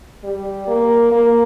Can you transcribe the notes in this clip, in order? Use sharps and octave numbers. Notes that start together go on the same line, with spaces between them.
G3
A#3
A#3